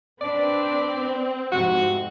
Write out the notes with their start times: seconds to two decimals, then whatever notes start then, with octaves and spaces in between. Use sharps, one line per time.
0.21 C4 D4 B4 D5
1.52 F2 G#2 C3 F#4